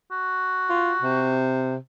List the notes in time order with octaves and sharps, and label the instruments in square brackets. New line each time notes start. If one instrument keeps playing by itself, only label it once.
[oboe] F#4
[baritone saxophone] F4
C3